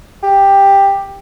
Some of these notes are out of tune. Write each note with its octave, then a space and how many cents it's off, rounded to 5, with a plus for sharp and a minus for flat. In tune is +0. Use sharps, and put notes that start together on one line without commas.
G4 +10